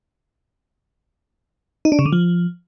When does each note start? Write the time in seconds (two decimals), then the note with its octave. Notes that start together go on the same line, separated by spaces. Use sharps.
1.85 D#4
1.92 D4
1.99 C#3
2.06 D3
2.13 F3